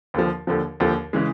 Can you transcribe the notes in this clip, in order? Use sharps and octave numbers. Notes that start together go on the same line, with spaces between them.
D#2 D3 F3
D#2 D3 F3
D#2 D3 F3
C#3 E3 G#3